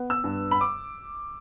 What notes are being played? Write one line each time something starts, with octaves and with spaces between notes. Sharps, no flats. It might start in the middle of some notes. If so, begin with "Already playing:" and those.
Already playing: B3
E6
G2
B5
D6